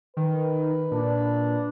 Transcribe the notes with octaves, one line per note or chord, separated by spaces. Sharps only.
D#3 B4
A#2 D4